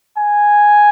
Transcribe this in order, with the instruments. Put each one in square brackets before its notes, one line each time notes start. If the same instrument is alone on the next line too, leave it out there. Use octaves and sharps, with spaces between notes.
[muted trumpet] G#5